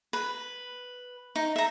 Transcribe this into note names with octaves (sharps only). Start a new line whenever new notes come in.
B4
D#4
E5 A#5